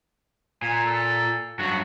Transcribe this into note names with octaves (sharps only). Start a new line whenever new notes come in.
A#2 G#5
A4
G2 F#3 F#4